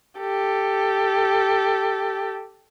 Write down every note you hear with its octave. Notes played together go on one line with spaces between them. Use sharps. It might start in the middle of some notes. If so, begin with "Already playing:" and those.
G4 A4